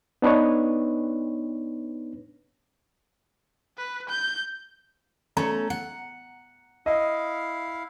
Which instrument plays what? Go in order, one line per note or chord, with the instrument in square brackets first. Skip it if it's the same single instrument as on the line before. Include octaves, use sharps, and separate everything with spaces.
[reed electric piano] B3 D4 D#4 B4 C#5
[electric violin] B4
G6
[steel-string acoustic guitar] A3 C#4 A4 [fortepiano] A#5
[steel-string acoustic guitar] F#5
[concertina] E4 F5 [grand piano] D#5